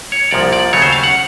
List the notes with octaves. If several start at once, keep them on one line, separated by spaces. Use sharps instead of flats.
C#5
C2 A#2 F3 D5
D5
D#2 C#3 F#3 A3 C#5
C5
F5
F#5